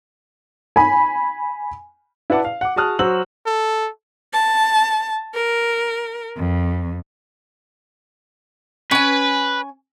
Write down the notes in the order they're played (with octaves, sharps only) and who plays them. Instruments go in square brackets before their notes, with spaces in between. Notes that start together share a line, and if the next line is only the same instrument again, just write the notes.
[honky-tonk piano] G#5 B5
[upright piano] E4 B4 D5 F#5 A5 D6
F5
F#5 D6
F#4 G#4 A5 D#6 F6 F#6
F#3 F#4 C5 E6 F#7
[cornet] A4
[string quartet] A5
A#4
F2
[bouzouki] C#4 G#5 [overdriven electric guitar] B4